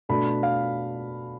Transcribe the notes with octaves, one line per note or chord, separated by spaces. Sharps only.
B2 A3 D4 B5
F5